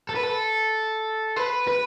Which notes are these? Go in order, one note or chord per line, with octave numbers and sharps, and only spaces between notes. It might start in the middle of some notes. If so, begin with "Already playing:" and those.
A4
B4
A4
B4
B4